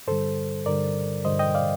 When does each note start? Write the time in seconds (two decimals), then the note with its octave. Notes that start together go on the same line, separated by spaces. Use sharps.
0.07 G2 D3 G3 A4 C5
0.66 G2 D3 G3 A#4 D5
1.25 G2 D3 G3 C5 D#5
1.39 D#5 G5
1.55 D5 F5